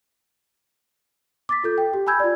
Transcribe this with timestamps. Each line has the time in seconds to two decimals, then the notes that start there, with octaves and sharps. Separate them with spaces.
1.49 D6 A6 B6
1.64 F4 A4 G6
1.78 G5
1.93 G4
2.07 G#5 B5 E6 G6 G#6
2.20 F4 D5